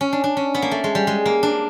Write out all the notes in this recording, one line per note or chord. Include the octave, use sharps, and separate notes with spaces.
C#4
D4
D4
C#4
B3
A#3
A3
G#3
G3
G#3
A#3
D4